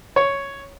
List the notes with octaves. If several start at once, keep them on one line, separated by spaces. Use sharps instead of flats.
C#5